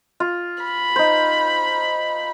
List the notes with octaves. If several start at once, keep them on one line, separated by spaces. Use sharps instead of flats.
F4
B5
D#4 C5